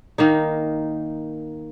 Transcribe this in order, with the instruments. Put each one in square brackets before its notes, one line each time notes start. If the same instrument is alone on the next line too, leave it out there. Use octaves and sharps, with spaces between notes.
[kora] D#3 A#3 D#4